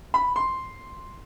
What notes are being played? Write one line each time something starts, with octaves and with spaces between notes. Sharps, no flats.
B5
C6